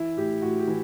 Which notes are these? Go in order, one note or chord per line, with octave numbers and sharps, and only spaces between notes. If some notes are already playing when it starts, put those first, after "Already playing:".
Already playing: E3 E4
A2 G4
A2 F#4
G4
E3